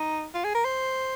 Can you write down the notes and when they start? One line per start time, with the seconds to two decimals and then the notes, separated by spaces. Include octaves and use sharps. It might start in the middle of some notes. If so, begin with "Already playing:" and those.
Already playing: D#4
0.34 F4
0.44 G#4
0.55 A#4
0.64 C5